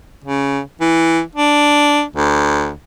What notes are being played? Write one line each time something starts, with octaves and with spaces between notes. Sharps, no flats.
C#3
E3
D4
D2